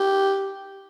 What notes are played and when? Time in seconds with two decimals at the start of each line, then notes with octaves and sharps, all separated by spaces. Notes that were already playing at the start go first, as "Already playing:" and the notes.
Already playing: G4